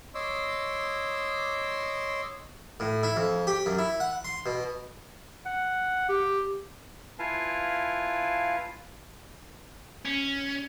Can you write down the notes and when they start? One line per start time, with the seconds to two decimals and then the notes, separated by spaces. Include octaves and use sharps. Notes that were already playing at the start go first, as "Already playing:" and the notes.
0.15 C#5 D#5 C6 D6 E6
2.80 A2
3.03 E4
3.16 F2
3.47 G4
3.66 F#2
3.78 E4
4.00 F#5
4.25 C6
4.46 B2
5.46 F#5
6.09 G4
7.19 E4 F4 B4 F5 G#5 A5
10.05 C#4